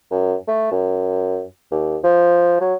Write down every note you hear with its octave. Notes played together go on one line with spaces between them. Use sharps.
F#2
A3
F#2
D#2
F3
F#3